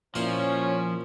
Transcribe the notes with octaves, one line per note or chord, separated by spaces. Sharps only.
A#2 F3 C#4 E4 C6